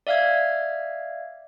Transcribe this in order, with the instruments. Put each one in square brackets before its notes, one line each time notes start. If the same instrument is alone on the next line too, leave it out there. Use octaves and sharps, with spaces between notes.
[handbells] D5 E5 F5 F6 G#6